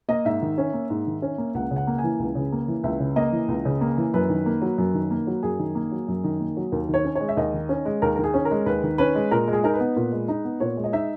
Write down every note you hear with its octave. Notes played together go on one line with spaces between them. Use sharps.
A#3 D#5
G#2 E5
D#3
C#4
A#3
G#2
D#3
C#4
A#3
C#2 F#5
C#3
F#5
A#3
G#5
E3
C#2
C#3
A#3
E3
C#2 E5
C#3
A#3 D#5
E3
C#2
C#3
A#3
E3
F#2 B4
D#3
A#3
F#3
F#2
D#3
A#3
F#3
F#2 G#4
D#3
A#3
F#3
F#2
D#3
A#3
F#3
D#2 A#4
D#3
C#5
C#4
G#3 C#5
E5
D#2 D#5
D#3
C#4
G#3
D#2 A#4
D#3 A#4
G#4
C#4
A#4
G#3
D#2 B4
D#3
C#4 B4
G#3
A#2 A#4
G#3
G#4
D#4 A#4
B4
B3
A#2
G#3
D#4
B3
A#2 C#5
G#3
D#5
D#4 E5